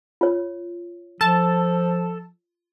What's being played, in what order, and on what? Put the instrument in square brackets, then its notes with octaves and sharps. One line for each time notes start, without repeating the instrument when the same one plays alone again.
[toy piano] F4 C#5
[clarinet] F3 [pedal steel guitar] A4 [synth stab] A5